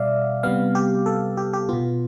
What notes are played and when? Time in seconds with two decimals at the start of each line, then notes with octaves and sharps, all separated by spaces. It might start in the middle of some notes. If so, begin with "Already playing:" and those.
Already playing: B2 G3 D5 E5 F5
0.43 C3 G3 B3 F5
0.75 G4
1.06 A4
1.37 G4
1.53 G4
1.69 B2 B3 F4